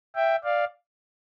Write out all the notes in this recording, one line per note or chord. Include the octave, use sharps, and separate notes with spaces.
E5 G5
D5 F5